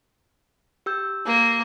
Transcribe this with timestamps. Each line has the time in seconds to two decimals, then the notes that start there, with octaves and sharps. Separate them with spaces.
0.86 G4 E6 G6
1.26 A#3